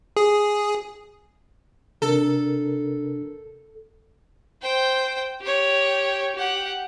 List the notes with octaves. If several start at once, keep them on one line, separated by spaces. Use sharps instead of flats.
G#4
C3 D4 A4 A#4
C5 G5
G4 C#5
G4 F#5